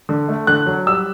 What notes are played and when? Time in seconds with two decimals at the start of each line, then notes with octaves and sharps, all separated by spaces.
0.09 D3
0.28 A3
0.47 D3 F#6
0.66 F#3
0.86 G3 E6